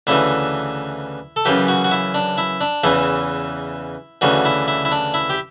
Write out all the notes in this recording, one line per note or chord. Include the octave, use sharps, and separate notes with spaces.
D2 C#3 E3 E4
A4
F#2 C#3 E3 G4
F#4
F#4
E4
D4
E4
D4
E2 C#3 E3 E4
D2 C#3 E3 F#4
E4
E4
E4
D4
E4
G4